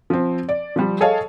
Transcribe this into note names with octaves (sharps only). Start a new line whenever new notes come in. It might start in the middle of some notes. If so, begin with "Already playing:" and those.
F3 C4
D5
F3 G3
G#4 A4 C#5 D#5 F5 A5